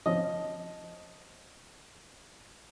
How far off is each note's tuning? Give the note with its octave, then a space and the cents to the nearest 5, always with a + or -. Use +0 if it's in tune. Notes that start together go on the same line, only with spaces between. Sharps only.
F3 +5 C#4 +0 D#5 +0